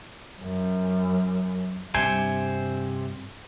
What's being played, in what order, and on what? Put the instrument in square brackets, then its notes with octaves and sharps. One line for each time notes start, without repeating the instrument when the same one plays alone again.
[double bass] F#2
[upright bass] G2 [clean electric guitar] C3 C5 G#5